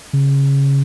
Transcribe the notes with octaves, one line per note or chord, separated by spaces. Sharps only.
C#3